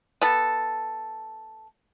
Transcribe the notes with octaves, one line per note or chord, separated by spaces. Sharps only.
B3 A4